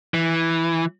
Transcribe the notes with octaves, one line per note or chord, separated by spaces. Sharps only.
E3